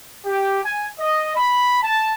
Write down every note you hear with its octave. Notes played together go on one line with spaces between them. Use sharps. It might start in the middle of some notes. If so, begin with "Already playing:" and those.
G4
G#5
D#5
B5
A5